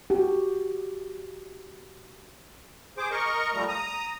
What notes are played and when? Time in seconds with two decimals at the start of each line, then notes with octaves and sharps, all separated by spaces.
0.10 F#4 G4
2.98 G#4 C5 D6
3.11 A#4 D#5 C#6
3.54 F3 G3 A3 A#5
3.68 A#5 D#6